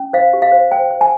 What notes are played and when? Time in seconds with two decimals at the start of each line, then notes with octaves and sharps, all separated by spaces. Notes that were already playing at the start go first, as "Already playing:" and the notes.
Already playing: C#4
0.13 C5 F5
0.33 G4
0.42 F5
0.52 C5
0.71 C5 G5
0.91 C5
1.01 G#5